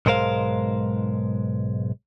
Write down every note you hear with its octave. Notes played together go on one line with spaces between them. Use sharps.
B1 G#2 G#3 A#4 C5 F5